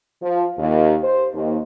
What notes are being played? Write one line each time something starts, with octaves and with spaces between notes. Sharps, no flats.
F3
D#2
C5
D#2